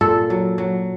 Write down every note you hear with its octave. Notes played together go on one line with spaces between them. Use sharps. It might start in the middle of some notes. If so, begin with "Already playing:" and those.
A#2 A4
F#3
F#3